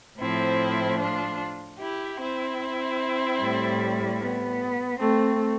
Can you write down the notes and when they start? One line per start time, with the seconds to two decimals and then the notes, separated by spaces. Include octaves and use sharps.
0.20 A2 F3 C4 E4
1.00 D4 F4
1.79 E4 G4
2.20 C4 E4
3.39 A2 G3
4.20 B3
5.00 A3 C4